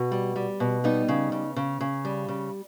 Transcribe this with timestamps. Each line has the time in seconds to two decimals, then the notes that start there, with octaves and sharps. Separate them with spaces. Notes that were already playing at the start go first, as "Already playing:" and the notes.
Already playing: B2
0.12 G3
0.36 G3
0.60 B2
0.84 G3 B3 D#4
1.08 C#3
1.32 C#3
1.56 C#3
1.81 C#3
2.05 G3
2.29 C#3